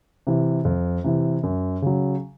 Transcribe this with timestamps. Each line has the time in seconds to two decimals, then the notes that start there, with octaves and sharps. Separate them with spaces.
0.27 C3 E3
0.65 F2
1.04 C3 E3
1.43 F#2
1.82 C#3 F#3